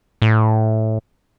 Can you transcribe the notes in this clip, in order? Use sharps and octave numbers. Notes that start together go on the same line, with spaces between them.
A2